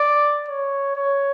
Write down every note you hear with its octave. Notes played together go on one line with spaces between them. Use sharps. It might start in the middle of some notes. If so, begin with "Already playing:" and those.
Already playing: D5
C#5
C#5